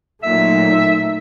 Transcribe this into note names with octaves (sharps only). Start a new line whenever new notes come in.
A#2 F#3 A3 D#4 E5